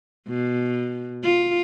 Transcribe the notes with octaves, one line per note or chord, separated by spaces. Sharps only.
B2
F4